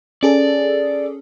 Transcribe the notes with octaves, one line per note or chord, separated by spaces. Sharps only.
C#4 G#4 A4 D5